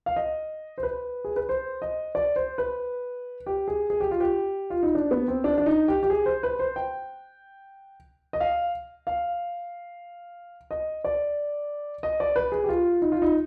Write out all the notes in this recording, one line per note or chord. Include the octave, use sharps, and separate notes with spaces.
F5
D#5
C5
B4
G#4
B4
C5
D#5
D5
C5
B4
G4
G#4
G#4
G4
F4
G4
F4
D#4
D4
B3
C4
D4
D4
D#4
G4
G4
G#4
C5
B4
C5
G5
D#5
F5
F5
D#5
D5
D#5
D5
B4
G#4
G4
F4
D#4
F4
D#4